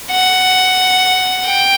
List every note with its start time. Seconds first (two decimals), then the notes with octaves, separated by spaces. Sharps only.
0.11 F#5
1.46 G5